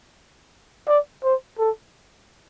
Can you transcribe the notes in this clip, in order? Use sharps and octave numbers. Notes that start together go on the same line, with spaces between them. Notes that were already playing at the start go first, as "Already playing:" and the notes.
D5
C5
A4